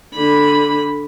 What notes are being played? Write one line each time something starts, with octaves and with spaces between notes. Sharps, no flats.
D3 B5